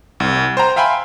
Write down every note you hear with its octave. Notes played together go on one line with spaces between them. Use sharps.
C2
C5 G5 A#5
E5 F5 G5 G#5 B5 C6